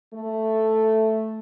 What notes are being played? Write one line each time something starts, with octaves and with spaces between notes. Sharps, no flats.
A3